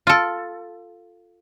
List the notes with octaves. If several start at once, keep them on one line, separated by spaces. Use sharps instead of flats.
F4 A4